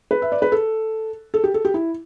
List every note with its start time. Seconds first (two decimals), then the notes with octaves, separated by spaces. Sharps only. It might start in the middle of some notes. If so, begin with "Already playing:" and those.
0.11 B4
0.22 E5
0.32 D5
0.42 B4
0.52 A4
1.34 A4
1.44 G4
1.54 A4
1.65 G4
1.74 E4